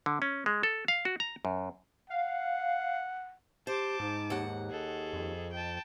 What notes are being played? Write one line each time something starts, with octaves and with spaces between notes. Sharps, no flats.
D3
C#4
G#3
A4
F5
F#4
A#5
F#2
F5 F#5
G4 C5 A5 D6
G#2 D#4
D#2 F#5
G#4 A4 D#5
F2
G5 A5